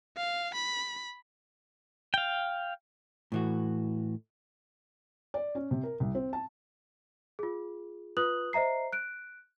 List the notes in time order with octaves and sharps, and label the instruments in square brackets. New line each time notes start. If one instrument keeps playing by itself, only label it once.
[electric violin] F5
B5
[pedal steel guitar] F5 G5
[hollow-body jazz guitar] A2 E3 F#4
[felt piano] D5
C#4
C3
A#4
C2
C4
A5
[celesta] F4 G#4
F4 B4 D#6 F#6 F#7
C5 D#5 E5 A#5 C7
F#6 D7